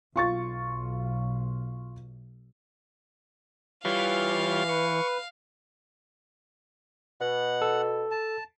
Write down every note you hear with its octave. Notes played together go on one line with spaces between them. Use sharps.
B1 F4 C#6 A6
E3 G3 F4 C#5 F5
B4 C#6
B2 F#5
A4
A5